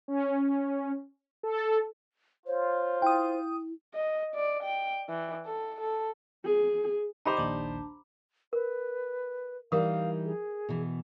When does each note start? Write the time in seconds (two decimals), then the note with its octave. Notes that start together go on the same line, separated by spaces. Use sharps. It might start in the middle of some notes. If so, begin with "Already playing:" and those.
0.08 C#4
1.43 A4
2.47 F4 C5 C#5
3.02 E4 G5 D#6
3.94 D#5
4.35 D5
4.63 G5
5.09 E3
5.46 A4
5.81 A4
6.45 G#4
7.26 D#4 G4 C5 D#5 A#5 B5 D6
7.37 A#1 D#2 D4 D5 A5
8.53 A#4 B4
9.72 E3 G3 D#4 A#4 F5 D#6
10.25 G#4
10.69 B2 E3